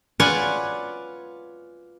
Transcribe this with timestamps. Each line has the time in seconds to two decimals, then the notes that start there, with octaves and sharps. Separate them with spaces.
0.20 F4 B4 C#5 D5 F#5 G#5